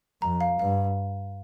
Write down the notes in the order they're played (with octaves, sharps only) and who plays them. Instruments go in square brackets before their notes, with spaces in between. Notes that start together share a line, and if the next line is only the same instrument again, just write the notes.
[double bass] F2 [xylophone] A#5
[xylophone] F5
[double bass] G2 [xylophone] F5